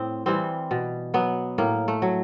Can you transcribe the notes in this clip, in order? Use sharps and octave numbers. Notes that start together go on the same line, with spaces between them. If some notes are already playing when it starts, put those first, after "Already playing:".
Already playing: A2 C4
E3 G3 C4
B2
F#3 B3
A2 A#3
A3
F#3